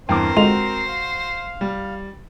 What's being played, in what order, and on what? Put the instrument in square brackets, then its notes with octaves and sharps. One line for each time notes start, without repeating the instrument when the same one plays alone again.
[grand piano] E2 G2 [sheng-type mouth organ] C4 A#4 [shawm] C5 [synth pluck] G5 D6
[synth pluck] D3 G#3 F4 [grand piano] F#4 F7
[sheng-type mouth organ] F5
[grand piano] G3